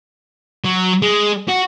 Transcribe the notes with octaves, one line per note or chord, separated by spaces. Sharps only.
F#3
G#3
F#4